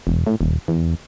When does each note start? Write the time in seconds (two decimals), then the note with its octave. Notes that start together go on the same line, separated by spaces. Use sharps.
0.07 E1
0.27 A2
0.41 D#1
0.68 E2